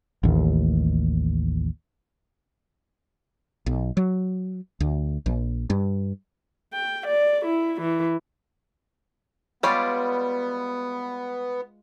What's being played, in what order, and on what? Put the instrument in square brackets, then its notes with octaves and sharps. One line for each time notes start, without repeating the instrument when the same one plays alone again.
[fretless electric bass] A1 D#2
B1
F#3
D2
A#1
G2
[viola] G5
D5
E4
E3
[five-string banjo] G3 C#5 B5 [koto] G#3 F4 D5 [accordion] B3